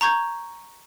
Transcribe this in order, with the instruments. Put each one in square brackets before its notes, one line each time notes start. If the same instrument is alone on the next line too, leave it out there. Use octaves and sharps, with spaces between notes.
[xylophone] A#5 C#6 G6 G#6